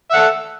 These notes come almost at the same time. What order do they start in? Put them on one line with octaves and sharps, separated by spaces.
E5 F#5 A4